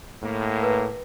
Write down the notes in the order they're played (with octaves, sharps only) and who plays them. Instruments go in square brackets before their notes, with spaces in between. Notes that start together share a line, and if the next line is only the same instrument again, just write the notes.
[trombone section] A2 A#3
[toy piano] B4